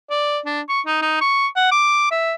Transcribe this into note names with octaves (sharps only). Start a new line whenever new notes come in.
D5
D4
C#6
D#4
D#4
C#6
F#5
D6
E5